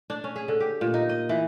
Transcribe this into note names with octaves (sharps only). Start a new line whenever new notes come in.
D4
C#4
G#4
D3
G4
A#2
D#4
D#5
E3